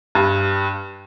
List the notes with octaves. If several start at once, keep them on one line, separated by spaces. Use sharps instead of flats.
G2